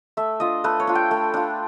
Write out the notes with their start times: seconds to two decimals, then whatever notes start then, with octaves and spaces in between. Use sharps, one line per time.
0.17 A3 E5
0.40 D4 F4 D#5
0.64 A3 B4
0.80 C#5
0.87 D4 F4
0.95 G5
1.11 A3
1.34 D4 F4